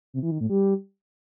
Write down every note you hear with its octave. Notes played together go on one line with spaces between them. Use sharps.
C3
E3
D#3
A2
G3